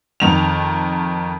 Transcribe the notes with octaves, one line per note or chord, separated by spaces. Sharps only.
F2 D#3 F7